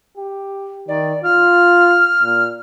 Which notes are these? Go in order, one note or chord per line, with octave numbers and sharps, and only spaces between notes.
G4
D#3 D5
F4 F6
A#2